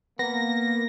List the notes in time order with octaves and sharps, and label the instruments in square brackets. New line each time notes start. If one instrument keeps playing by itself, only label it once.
[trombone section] A#3 [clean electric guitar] B3 [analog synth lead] A#6